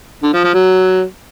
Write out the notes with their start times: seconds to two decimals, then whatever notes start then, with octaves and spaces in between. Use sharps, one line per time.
0.23 D3
0.34 F3
0.44 F3
0.54 F#3